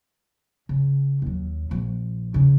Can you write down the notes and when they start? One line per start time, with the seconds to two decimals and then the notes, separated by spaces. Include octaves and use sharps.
0.69 C#3
1.22 D#2 F#3
1.71 A#1 F3
2.34 C#3 D4